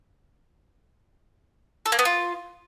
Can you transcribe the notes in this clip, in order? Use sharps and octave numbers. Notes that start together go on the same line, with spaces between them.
A4
A#3
B3
F4